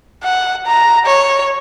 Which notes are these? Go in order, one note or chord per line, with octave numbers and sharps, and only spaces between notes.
F#5
A#5
C#5